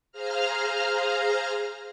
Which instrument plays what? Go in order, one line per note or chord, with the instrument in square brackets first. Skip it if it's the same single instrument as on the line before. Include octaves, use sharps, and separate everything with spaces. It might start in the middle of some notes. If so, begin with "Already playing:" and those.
[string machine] G#4 C5 F5 A#5 F6